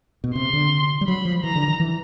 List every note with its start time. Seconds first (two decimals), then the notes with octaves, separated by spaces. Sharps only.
0.24 B2
0.35 C3 C6
0.53 D3
1.01 G3
1.07 F#3 B5
1.25 F3
1.44 E3 A#5
1.56 D3
1.68 D#3
1.80 E3